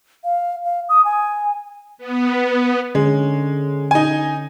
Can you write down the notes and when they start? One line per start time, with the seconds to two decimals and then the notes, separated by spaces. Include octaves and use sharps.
0.24 F5
0.65 F5
0.89 D#6
1.05 G#5
1.98 B3
2.95 D3 G#3 C#4
3.91 D#4 G#5